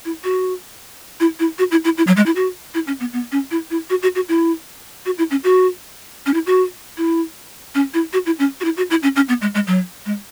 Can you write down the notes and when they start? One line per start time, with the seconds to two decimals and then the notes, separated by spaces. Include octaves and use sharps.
0.05 E4
0.24 F#4
1.20 E4
1.40 E4
1.59 F#4
1.71 E4
1.85 E4
1.98 E4
2.07 F#3
2.17 G#3
2.26 E4
2.36 F#4
2.74 E4
2.87 C#4
3.00 B3
3.13 B3
3.32 C#4
3.51 E4
3.70 E4
3.90 F#4
4.02 F#4
4.15 F#4
4.29 E4
5.06 F#4
5.18 E4
5.31 C#4
5.44 F#4
6.26 C#4
6.34 E4
6.47 F#4
6.98 E4
7.75 C#4
7.94 E4
8.13 F#4
8.26 E4
8.39 C#4
8.61 F#4
8.64 E4
8.77 F#4
8.90 E4
9.03 C#4
9.16 C#4
9.29 B3
9.42 G#3
9.55 G#3
9.67 F#3
10.06 G#3